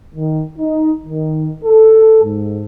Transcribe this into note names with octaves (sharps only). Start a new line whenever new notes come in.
D#3
D#4
D#3
A4
G#2